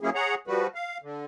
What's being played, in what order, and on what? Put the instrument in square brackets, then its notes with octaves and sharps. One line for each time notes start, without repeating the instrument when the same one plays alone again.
[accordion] F#3 A#3 C#4 E4 G#4
G#4 C#5 F#5 A#5
F3 G3 F#4 B4
F5
D3